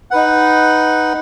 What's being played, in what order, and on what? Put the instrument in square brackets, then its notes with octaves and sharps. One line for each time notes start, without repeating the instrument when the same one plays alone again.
[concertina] D#4 B4 F#5